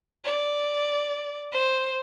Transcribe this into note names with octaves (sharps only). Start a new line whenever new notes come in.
D5
C5